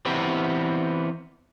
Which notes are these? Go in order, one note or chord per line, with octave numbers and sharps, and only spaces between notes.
E3 B3 C4 G4